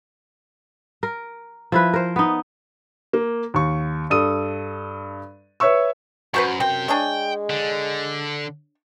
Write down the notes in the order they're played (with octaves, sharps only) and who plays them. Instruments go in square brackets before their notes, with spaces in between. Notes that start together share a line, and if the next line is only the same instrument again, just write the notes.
[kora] A#4
F3 E4 B4
A#4 C5
B3 D#4
[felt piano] A#3
D#2 C#6
G2 A4 D#6 D#7
B4 C#5 E5 C#6 E6
[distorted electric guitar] F#2 [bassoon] F#4 [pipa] B4 C5 C#6
[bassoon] F#2 [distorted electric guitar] C3 G5 [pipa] C4
[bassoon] G#3 [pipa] D4 G#4 C#5 [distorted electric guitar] G5
[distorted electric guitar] D3